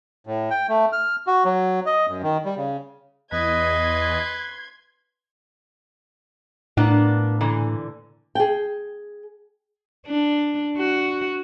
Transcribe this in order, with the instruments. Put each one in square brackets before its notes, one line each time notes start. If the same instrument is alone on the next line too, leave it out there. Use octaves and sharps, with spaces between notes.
[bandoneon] A2
G5
A3
F6
F#4
F#3
D#5
F#2
D#3
G3
C#3
[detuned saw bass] E2 [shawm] B4 [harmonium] D#5 [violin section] C6 G#6
[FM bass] A2 [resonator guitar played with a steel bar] A#3 B3 D4
[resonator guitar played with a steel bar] A#2 D3 E3
[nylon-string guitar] G#4 G5
[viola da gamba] D4
F#4